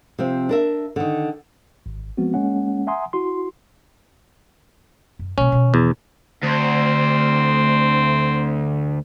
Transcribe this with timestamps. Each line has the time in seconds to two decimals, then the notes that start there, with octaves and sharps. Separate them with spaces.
0.19 C3 F3 C4
0.49 D4 A#4 E5
0.96 D3 D#3
1.86 G#1
2.17 F3 G#3 B3 C4 F#4
2.34 G#3 A#3 C#4 F#5
2.87 E5 F#5 G#5 A#5 C6 D#6
3.13 E4 F#4 C6
5.19 F#2
5.38 B2 A#3 C#4
5.52 B2 D#3
5.74 E2
6.43 D2 C4